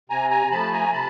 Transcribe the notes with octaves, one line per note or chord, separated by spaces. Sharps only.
C3 G#5 A#5
G#5 A#5
F3 A3 A5 B5
G#5 A#5
C3 A5 B5